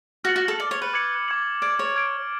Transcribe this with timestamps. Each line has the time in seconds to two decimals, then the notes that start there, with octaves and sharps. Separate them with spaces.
0.24 F#4 F6 A6 C#7 F#7
0.36 F#4
0.48 A4
0.59 D5 F6 A6 C#7 F#7
0.71 C#5
0.82 B4
0.93 D6 G#6 C#7 F#7
1.28 D6 G#6 C#7 F#7
1.62 D5 F6 G#6 D7
1.79 C#5
1.96 F6 G#6 D7